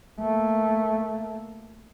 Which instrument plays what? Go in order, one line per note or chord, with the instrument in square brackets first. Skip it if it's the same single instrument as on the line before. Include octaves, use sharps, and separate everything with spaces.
[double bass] A3 A#3